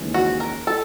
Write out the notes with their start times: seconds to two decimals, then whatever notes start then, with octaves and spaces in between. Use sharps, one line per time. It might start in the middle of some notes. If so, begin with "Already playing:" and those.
Already playing: D#2 C#3 E3 G#3 C#4
0.14 F#4
0.40 A#4
0.67 A4